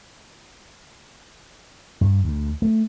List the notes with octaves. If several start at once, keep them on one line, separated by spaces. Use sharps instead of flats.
G2
D2
A3